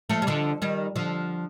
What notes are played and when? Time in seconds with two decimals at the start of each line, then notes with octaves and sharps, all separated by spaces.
0.09 F3 A3
0.22 G3
0.27 D3 F3
0.62 D#3 G3
0.96 D3 F3